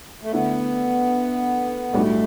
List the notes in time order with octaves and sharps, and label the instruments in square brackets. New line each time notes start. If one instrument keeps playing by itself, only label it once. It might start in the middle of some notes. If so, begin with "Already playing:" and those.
[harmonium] A3
[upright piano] D3 A3 E4 [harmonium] B3
[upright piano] B1 A2 G3 D4 F#4 [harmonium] A3